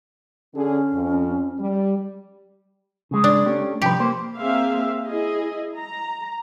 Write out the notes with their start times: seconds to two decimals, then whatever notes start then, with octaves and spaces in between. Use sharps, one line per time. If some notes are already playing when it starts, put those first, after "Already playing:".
0.55 D3 C#4 G#4
0.93 F2
1.59 G3
3.11 C#3 G#3
3.24 D4
3.46 A3 C#4 G4
3.82 C2 F3 G4 B4
4.00 A#3 C5
4.38 A#3 C4 G#4 E5 F5
5.05 E4 G#4 D#5
5.76 A#5